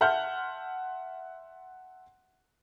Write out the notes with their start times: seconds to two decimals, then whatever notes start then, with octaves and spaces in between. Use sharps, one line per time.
0.01 E5 F#5 A5 C6 F6 G6